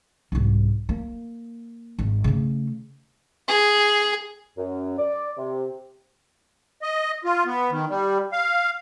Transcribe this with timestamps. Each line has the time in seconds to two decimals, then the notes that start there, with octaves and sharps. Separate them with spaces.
0.32 C2 G#2
0.89 A#3
1.99 G#1
2.24 C#3 A3
3.48 G#4
4.58 F#2
4.98 D5
5.37 C3
6.82 D#5
7.25 F4
7.46 B3
7.71 D#3
7.89 G3
8.32 F5